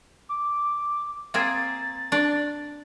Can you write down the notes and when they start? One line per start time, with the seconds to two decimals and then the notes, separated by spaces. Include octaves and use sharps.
0.29 D6
1.34 A#3 C4 G#4 A6
2.12 D4 D5